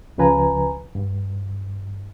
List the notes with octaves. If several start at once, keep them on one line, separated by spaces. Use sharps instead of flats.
C#2 C#3 F3 B4 G#5 A#5
G2